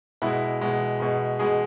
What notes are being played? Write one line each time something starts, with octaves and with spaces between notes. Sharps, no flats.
B2 G#3 E4
B2 G#3
B2 G#3
B2 G#3 G#4